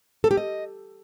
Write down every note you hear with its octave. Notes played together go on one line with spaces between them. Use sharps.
A4
G4
D#5